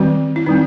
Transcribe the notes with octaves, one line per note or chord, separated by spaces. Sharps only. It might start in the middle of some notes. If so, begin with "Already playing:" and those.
Already playing: D#3 G3 C4 F#4
E4
D#3 G3 C4 D#4